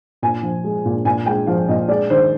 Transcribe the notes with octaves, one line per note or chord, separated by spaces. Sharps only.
A#2 G#5
F3
G#3
A#2
A#2 G#5
G#3 G5
F3 F5
A#2 D#5
G#3 D5
D#3 C5